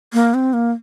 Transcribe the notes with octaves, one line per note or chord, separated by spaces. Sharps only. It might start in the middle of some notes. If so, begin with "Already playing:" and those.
A#3
C4
A#3